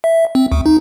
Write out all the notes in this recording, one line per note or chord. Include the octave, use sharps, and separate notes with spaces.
E5
C4
D2
D#4